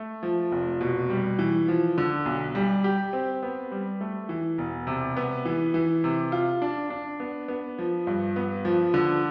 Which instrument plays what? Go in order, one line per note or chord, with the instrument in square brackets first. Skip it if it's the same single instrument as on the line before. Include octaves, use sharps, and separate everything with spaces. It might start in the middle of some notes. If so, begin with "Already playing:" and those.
Already playing: [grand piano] A3
F3
F1
B2
G3
E3
F3
D3
B1
G3
G4
C4
B3
G3
A3
E3
E1
C3
B3
E3
E3
C3
F4
D4
D4
B3
B3
F3
G2
B3
F3
D3